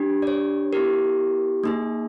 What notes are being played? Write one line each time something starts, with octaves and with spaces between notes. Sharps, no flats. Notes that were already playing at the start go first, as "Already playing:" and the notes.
Already playing: D4 G4
D5
C#5
B3 E4 G4 A#4
A#3 D#4 G#4